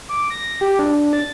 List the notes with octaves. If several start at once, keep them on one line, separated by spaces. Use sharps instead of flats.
D6
A#6
G4
D4
A6